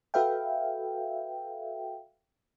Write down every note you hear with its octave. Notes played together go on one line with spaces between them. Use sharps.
F#4 A4 B4 E5 F5 G5